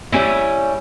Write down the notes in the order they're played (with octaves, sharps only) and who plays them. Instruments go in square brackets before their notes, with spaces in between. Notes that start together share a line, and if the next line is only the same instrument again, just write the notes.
[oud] G3 C#4 E4